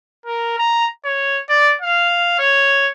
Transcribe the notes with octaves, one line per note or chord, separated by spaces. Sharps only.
A#4
A#5
C#5
D5
F5
C#5